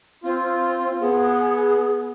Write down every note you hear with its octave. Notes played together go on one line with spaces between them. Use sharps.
C4 F4
B3 G#4